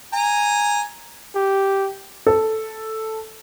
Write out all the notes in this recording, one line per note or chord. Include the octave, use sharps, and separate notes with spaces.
G#5 A#5
G4
A4